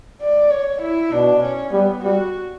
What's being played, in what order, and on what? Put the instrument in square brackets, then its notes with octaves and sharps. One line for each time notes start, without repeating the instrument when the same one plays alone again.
[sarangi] D5
C#5
E4
[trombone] B2 [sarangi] D4
[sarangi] C#4
[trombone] G3 [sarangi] B3
[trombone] G3 [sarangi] F#4